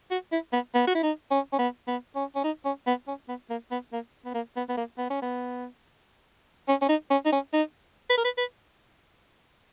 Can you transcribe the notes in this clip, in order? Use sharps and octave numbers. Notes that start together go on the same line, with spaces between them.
F#4
E4
B3
B3
F#4
E4
D#4
C#4
C#4
B3
B3
C#4
C#4
D#4
C#4
B3
C#4
B3
A#3
B3
A#3
B3
A#3
B3
B3
A#3
B3
C#4
B3
C#4
C#4
D#4
C#4
D#4
C#4
D#4
B4
A#4
B4
B4